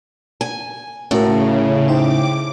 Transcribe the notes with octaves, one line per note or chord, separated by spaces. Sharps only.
G#5
A2 C#3 C#4 F#4 A#4
D#4 C5 G5 D6